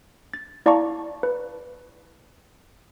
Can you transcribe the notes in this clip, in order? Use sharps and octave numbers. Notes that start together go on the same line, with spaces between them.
A6
E4 D5 F5 A5 A#5 C#6
B4